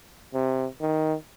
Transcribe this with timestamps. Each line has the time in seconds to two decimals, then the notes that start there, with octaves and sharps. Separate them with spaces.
0.34 C3
0.81 D#3